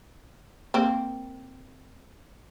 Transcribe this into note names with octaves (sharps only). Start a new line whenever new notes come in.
A#3 C4